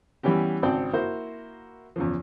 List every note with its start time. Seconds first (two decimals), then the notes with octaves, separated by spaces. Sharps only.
0.23 E3 G3 B3 C#4 G4
0.62 G#1 C#3 C4 D5 G5 A5
0.93 A#3 E4 F#4 A#4 C5
1.96 E2 C#3 F3